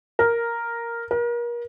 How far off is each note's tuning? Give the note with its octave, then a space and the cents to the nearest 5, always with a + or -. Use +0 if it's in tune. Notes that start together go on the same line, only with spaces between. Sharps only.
A#4 +0
A#4 +35